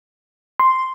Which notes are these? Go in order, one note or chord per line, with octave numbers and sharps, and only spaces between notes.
C6